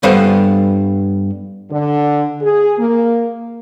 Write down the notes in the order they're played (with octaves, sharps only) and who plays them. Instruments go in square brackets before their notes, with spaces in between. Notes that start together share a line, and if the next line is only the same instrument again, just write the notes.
[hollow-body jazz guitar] G2 G3 B3 A4 C5 F#5
[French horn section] D3
G#4
A#3